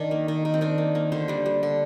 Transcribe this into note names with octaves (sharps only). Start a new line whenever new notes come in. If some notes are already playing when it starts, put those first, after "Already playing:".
Already playing: D#3 D4
A#3
D#3
D#3
C4
D#3 D4
A#3
A#3
D3 C5
G3 D4
G3
D3